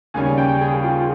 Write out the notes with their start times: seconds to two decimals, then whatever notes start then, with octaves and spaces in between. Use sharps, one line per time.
0.14 D#2 C#3 G3 C#4 G#5
0.37 G5
0.61 G#4
0.84 F4